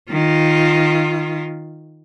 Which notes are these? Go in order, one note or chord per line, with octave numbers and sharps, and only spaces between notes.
D#3 F4